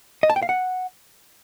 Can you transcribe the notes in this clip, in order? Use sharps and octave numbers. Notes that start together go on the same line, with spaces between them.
D#5
A5
G5
F5
F#5